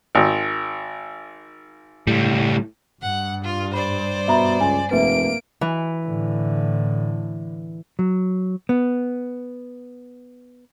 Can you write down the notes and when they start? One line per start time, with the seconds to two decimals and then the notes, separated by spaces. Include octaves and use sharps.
0.15 G#1
2.07 C#2 A2 G3
3.02 G2 F#5
3.44 F4
3.74 C5 D5 B5
4.28 B2 E5 A#5 B5
4.61 C#2 G#5
4.91 F1 A#3 B4 E5 D7
5.61 E3
6.05 A2 D3
7.99 F#3
8.69 B3